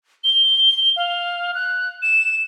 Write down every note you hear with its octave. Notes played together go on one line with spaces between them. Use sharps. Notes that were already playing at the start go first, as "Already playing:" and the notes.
G7
F5
F#6
E7